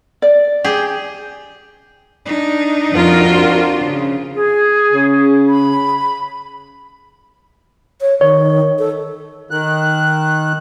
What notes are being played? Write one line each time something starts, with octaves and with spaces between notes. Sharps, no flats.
D5
G4 G#4
D4 D#4
F2 F4 F#4 A#4
D4 C5
C#3
G#4
C#3
B5
C#5
D#3 C#5
A4
D#3 F#6